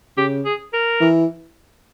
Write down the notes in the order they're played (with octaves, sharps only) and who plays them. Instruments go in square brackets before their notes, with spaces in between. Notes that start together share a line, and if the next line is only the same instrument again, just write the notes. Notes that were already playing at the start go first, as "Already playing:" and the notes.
[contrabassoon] C#3 [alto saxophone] G4
[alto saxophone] G#4
A#4
[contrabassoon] E3